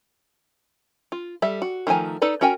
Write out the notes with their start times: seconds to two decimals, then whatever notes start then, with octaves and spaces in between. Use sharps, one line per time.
1.12 F4
1.42 G3 A4 E5
1.62 F#4
1.87 D#3 F3 A3 G#5 A#5
2.22 D#4 A4 B4 D5
2.41 C#4 F#4 A#4 G5 G#5